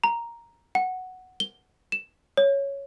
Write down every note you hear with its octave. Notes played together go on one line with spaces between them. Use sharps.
A#5
F#5
G7
E7
C#5